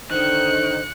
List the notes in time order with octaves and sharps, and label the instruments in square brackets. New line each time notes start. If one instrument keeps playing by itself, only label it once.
[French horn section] D3 [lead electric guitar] D#3 [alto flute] C5 [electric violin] F#6 C#7